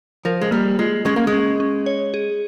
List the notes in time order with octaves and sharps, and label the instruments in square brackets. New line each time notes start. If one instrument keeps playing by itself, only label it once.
[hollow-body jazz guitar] F3 [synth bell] A#4
[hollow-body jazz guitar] G#3
[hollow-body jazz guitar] G3 [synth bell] A#3
[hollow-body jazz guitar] G#3 [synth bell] F4
[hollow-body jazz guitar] G#3 [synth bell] C#4
[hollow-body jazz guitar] A#3
G#3
[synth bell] C#4
C#4
C#5
G#4